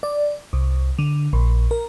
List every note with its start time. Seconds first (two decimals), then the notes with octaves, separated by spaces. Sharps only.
0.03 D5
0.53 C2
0.99 D3
1.33 A#1
1.71 A#4